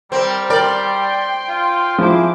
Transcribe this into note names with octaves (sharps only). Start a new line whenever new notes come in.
G3 C4 A#4
A#4 D5 G5 C6
F4
F3 E4 G#4 C5 D6